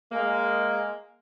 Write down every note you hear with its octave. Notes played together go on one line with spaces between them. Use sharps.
G#3 A#3